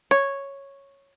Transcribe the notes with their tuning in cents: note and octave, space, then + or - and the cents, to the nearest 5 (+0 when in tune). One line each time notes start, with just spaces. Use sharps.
C#5 -5